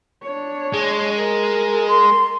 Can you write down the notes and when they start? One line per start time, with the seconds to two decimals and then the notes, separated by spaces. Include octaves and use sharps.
0.24 D4 C#5
0.74 G#3
1.18 A#4
1.89 C6